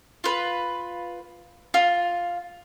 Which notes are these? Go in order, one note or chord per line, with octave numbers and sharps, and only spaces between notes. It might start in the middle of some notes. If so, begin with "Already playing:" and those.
F4 B4
F4